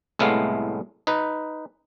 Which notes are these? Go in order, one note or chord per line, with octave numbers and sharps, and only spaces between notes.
C2 A2 G#3 A3 B3 F5
D#4 B4